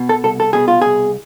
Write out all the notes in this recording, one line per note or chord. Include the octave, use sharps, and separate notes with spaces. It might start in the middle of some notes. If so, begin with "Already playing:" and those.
Already playing: B2
A4
C2 A4
A4
B2 G#4
F4
C2 G#4